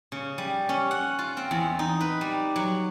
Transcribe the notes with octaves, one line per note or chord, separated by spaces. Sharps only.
C#3
G3
C#4
F#5
F4
C4
E2
D#4
B4
G3
F#3